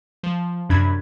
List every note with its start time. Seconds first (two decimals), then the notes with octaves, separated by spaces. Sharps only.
0.23 F3
0.70 F#2 C3 D4 B5 G#6